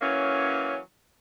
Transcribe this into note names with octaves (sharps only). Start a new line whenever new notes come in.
E3 F#3 A#3 C#4